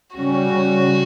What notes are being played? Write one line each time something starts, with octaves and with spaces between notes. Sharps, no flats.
C#3 G3 C#4 F#4